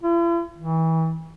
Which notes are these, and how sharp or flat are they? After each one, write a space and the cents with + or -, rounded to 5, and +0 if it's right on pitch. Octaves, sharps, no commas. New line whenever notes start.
E4 +45
E3 -30